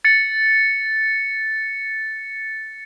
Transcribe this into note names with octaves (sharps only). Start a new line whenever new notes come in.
A6 C#7